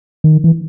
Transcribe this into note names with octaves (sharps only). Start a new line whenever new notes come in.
D#3
E3